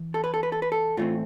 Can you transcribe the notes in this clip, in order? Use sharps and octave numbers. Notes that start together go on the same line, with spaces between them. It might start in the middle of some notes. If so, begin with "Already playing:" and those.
Already playing: E3
A4
B4
A4
B4
A4
B4
A4
A2 E3 A3 C4 F4